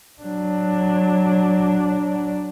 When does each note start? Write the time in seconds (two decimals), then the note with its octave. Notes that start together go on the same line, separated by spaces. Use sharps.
0.22 F#3 D4